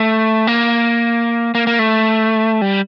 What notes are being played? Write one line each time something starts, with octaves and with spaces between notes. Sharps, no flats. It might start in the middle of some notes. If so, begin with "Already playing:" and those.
Already playing: A3
A#3
A#3
A#3
A3
G3